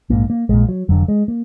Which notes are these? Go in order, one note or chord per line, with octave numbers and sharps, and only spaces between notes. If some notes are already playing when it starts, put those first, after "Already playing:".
A#1 G#2 A#3
A#3
A#1 A#2 G#3
F#3
F1 F2 D3 F#3
G#3
A#3